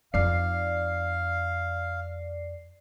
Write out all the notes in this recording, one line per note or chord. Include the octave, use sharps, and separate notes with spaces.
F2 D#4 D5 F5 C7